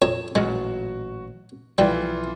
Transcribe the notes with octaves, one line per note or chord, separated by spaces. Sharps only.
F2 C#5 A#5 E7
A1 A#2 F#3 G#3 F#4
B1 E3 F3 G3 F4